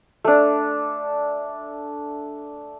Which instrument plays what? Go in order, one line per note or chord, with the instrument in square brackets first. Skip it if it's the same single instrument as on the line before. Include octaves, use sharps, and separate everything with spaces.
[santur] A3 D4